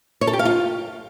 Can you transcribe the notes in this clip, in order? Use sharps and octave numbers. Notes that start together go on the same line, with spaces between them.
C#5
A4
G4
F5
F4